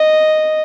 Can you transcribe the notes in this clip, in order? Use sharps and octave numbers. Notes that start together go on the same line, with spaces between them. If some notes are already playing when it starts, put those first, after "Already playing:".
Already playing: D#5